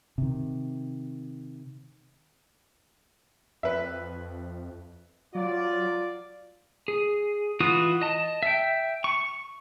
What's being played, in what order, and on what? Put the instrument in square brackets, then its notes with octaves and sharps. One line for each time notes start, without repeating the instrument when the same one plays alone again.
[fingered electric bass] C3 D#3
[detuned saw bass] F2 [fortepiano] B4 E5
[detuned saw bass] F#3 [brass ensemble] F4 D5
[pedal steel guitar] G#4
E3 F4 F#4 D#6
D#5 A5
E5 G5
C#6